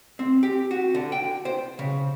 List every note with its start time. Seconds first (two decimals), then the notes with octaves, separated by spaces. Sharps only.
0.19 C4
0.43 G4
0.71 F#4
0.95 D3
1.12 G5
1.45 C5
1.79 C#3